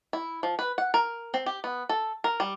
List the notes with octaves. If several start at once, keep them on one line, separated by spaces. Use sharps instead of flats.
E4
F3
B4
F#5
A#4
C4
G4
B3
A4
A#4
G3